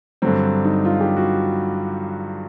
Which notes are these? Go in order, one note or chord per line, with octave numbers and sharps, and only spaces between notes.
G2 D3 F#3 C4
D#4
F4
G4
F#4